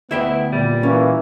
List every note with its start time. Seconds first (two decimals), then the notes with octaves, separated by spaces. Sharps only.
0.11 D2 B3 E4 E5 G5
0.53 A#2 G3
0.83 E3 A#3 C#4